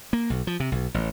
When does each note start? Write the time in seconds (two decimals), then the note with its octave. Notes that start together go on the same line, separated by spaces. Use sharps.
0.13 A#3
0.30 B1
0.47 F3
0.60 C3
0.72 B1
0.94 A1